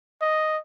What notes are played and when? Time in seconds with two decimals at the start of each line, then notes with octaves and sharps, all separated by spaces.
0.21 D#5